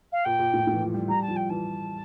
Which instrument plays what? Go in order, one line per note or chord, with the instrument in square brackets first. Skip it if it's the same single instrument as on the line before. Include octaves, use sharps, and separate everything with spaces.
[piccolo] F5
[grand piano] A#2 [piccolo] G5
[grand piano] A#2
A2
A2
E3
F3
G3
[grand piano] G3 [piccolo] A#5
[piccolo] A5
[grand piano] F3
[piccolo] G5
[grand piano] E3 [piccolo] A5